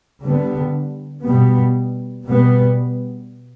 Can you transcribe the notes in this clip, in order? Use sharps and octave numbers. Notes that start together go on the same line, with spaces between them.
D3 G3 B3
B2 G3 B3
B2 G3 B3